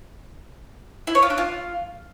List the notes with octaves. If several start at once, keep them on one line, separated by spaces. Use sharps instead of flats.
E4
C#5
F4
D4
F4